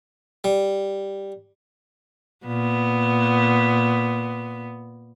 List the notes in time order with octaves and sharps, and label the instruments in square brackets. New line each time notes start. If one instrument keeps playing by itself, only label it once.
[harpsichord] G3
[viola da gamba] A#2 B3